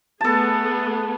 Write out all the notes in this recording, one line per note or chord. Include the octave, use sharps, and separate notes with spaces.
A3 B3 G#4 A4 A5